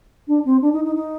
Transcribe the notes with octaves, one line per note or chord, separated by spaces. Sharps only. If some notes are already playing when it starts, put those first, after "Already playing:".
D4
C4
D4
D#4
D#4
D#4